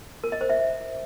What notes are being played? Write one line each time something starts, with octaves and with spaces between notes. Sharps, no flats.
A#4
D#5
C5
E5